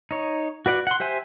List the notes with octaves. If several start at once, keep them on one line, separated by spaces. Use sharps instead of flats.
D#4 C#5
F#4 B4 D5 F#5
F#5 C6
G4 C5 E5 G#5